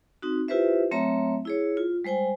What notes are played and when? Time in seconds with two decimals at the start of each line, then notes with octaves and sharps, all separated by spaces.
0.22 C4 D#4 F#4
0.48 E4 F4 G4 B4 C5 E5
0.91 F#3 A3 C4 C#5 E5 A#5
1.45 E4 G#4 C#5
1.77 F4
2.04 G3 G#3 C5 G5 G#5